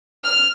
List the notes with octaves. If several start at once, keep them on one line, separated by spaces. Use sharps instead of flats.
F6